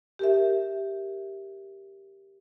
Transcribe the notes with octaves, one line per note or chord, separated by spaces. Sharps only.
G4 A#4 E5